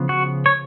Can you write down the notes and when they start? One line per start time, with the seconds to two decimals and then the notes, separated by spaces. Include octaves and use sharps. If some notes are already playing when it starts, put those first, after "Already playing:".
Already playing: C#3 F3 B3
0.09 F#4
0.46 C#5